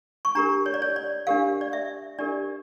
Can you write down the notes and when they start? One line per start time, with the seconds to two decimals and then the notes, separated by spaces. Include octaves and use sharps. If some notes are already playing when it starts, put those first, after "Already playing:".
0.25 C#6
0.35 D4 G4 A#4 A#5
0.66 C#5
0.74 D5
0.82 C#5
0.96 D5
1.27 D4 G4 A#4 F5
1.61 D5
1.73 E5
2.19 D4 G4 A#4 D5